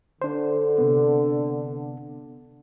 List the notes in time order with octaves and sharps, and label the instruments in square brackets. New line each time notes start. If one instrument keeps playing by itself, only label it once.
[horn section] D3 [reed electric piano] D4 C5
[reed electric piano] C3 B3